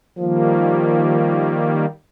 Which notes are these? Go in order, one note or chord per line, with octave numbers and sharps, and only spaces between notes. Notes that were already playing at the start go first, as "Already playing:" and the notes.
D#3 F3 G3 A#3